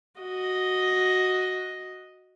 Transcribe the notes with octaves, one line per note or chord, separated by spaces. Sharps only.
F#4 D#5